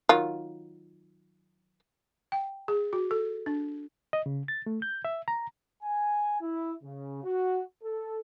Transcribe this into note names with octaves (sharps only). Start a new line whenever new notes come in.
D#3 F#3 F4
G5
G#4
F#4
A4
D4
D#5
C#3
A6
A3
G6
E5
A#5
G#5
E4
C#3
F#4
A4